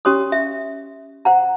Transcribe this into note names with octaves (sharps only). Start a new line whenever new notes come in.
C#4 G4 C#5 C6 D#6
E5
C5 F#5 A#5